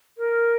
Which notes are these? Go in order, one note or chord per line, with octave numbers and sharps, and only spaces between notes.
A#4